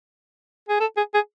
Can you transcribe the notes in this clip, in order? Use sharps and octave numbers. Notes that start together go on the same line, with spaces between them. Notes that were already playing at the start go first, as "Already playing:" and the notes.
G#4
A4
G#4
G#4